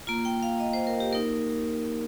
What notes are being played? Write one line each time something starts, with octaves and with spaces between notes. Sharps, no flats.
A#3 F4 A#5
G5
F5
D#5
C5
A#4
G4
A#3 D#4 A#4